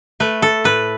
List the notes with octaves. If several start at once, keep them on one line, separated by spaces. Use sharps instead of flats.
A3 B4
A4
A2 B4